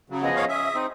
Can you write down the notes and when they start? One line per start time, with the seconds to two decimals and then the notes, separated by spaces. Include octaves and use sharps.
0.10 C#3 F#3
0.22 F3 B3 G#4 D#5
0.36 C#5 F5
0.48 C#4 E5 D#6
0.75 C4 D#4